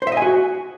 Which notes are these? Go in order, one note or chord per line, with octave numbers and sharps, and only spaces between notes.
C5
E5
D#5
G#5
F#4